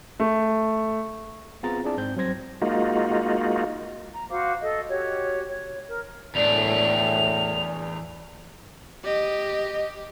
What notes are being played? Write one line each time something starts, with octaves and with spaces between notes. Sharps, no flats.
A3
B3 C4 F4 G#4 A#5 A6
C4 D4 E4 G#4 D5 A5
G#2 C4 G6
F#3 G3 C4 C5 G#6 A#6
G#3 A#3 D#4 F4 F#4
A#5
F#4 C5 F5 D6
A4 D#5
F#4 G4 C#5
C#5
A#4
E2 A2 D4 D5 F7
G4 D#5